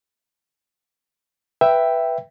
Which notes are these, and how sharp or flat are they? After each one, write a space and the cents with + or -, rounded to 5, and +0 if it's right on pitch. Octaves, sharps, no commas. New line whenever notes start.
B4 +0 E5 +5 G5 +0